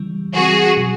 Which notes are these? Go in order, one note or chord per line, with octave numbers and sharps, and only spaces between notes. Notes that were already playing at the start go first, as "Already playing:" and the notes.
Already playing: C#3 E3 G3
E3 G3 C4 F#4 G#4
B2 F#3